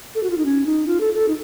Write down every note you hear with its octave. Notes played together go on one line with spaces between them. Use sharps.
A4
F#4
F4
D#4
C#4
D#4
F4
A4
A4
D#4